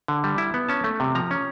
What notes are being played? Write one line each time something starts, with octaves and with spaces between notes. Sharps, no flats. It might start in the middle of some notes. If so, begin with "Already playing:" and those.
D3
G3
E4
B3
C#4 A5
A3
C3
F3 A#5
C#4